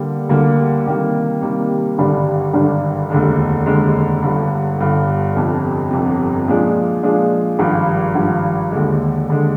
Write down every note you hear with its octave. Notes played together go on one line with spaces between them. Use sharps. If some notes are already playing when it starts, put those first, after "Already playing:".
Already playing: D3 G3 A#3
D2 D3 G3 A#3
C3 D#3 G3 A#3
C3 D#3 G3 A#3
G#1 G2 D3 G3 D4
G#1 G2 D3 G3 D4
F1 D#2 D3 G#3
F1 D#2 D3 G#3
G1 G2 D3
G1 G2 D3
G1 F2 C3
G1 F2 C3
A#2 F3 G#3 D4 G#4
A#2 F3 G#3 D4 G#4
G#1 G2 F3
G#1 G2 F3
D#2 D3 G#3
D#2 D3 G#3